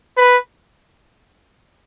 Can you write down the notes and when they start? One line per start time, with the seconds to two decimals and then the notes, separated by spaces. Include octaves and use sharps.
0.17 B4